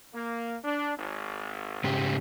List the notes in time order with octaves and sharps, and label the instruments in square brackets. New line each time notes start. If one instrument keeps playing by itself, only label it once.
[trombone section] A#3
D4
G#1
[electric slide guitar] G#2 C#3 G4